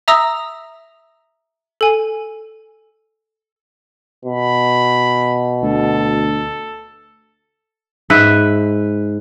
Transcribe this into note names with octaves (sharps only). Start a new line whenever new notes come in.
E5 A#5 D#6 E6 A#6
A4 G#5
B2 B5
D2 A4
G#2 B4 E5